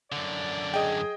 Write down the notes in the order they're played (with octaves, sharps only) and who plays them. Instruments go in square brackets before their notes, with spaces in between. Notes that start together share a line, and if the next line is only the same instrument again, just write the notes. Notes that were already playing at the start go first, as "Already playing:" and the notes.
[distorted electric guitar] F#2 D3 [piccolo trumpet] D5
[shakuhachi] G#4 [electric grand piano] D#5 G5